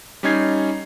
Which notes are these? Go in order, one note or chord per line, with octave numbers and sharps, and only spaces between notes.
G3 C#4 D#4 G#6 C7